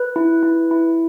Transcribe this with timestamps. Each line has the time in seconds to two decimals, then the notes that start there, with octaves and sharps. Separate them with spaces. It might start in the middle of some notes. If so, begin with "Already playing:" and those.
Already playing: B4
0.16 E4
0.43 E4
0.71 E4